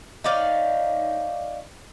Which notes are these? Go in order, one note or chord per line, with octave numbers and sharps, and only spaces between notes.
D#4 C#5 D5 F5